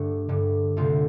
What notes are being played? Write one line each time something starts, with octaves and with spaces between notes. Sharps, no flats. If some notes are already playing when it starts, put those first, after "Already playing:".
Already playing: G2 D3 A3 D4
G2 D3 A3
D2 C3 A3 C4 F4